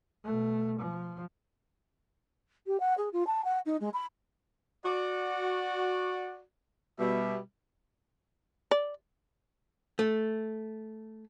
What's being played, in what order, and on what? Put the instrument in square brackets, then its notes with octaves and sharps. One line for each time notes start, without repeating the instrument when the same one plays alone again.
[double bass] B2 A3
F3
[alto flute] G4
F#5
G#4
F4
A5
F#5
D#4
G#3
B5
[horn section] F#4 D5
B2 G3 E5
[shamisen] D5
[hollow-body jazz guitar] A3